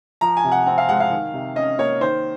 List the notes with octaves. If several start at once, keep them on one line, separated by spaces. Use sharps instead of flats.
F3 A#5
G#5
C3
F#5
C4 F#5
F5
G#3 F#5
F5
D#3
C3
C#4 D#5
A#3 C#5
D#3 C5